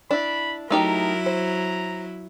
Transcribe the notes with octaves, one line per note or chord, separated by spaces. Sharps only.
D4 E4 B5
F#3 A3 D#4 E4 G4 A#4
C5 A#5